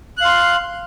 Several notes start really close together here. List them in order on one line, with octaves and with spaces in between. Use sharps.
F#6 F5 C6